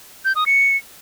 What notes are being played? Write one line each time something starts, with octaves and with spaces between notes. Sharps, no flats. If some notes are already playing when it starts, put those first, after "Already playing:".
G6
D#6
C#7